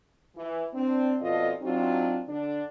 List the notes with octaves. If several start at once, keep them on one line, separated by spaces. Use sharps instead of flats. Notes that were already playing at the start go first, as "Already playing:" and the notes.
E3
C4 D4
F2 B2 F4 A4 D5 D#5
F#3 C4 D4 D#4 F4 F#4
D3 D4